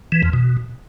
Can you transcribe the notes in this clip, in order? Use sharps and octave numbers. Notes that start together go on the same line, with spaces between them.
E3
F2
B2